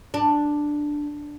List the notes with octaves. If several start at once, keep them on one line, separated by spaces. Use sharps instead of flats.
D4